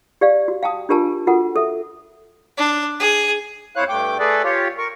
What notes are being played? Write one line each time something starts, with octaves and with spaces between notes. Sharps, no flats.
G4 D5 F5
F#4
F5 G5 A5 D#6
D4 F4 G4 A#4 G#5 A5
F4 F#4 A4 A#4 F#5
A4 E5
D4
G#4
F2 E4 C5 C#5 F5 F#6
G2 A3 G5 D6
A3 G#4 A4 B4 D5
F4 G4 C#5
A#4 C#6